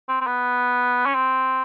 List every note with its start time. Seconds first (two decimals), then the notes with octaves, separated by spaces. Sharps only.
0.09 C4
0.21 C4
0.26 B3
1.06 C#4
1.14 C4